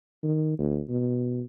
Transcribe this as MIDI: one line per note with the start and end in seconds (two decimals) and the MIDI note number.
0.23 0.58 51
0.59 0.81 38
0.89 1.42 47